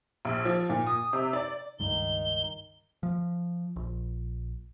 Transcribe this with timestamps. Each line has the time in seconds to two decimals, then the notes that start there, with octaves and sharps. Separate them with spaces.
0.25 A#1
0.45 F3
0.69 A#2
0.87 D#6
1.13 C3
1.33 D5
1.80 C#2 G2 D#3 D#4 G7
3.03 F3
3.76 A#1